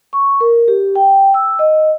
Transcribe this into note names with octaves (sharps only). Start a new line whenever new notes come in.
C#6
A#4
G4
G5
E6
D#5